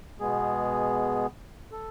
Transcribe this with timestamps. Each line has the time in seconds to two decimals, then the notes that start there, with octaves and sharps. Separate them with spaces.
0.20 B2 G#3 B3 G#4
1.72 A4